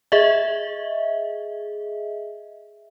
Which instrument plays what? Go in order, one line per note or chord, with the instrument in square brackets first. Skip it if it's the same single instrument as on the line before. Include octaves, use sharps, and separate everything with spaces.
[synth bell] G#4 D#5 E5